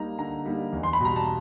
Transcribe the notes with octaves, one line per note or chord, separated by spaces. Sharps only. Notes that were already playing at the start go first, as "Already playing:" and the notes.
Already playing: G3 A#3 D#4 A#5
D3 A#5
G3 A#3 D#4
E2
C6
B5
B2 G3 A#5
A5